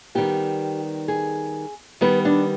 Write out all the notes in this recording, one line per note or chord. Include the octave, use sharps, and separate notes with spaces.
D#3 G3 B3 G4
G#4
D#3 G3 B3 B4
D4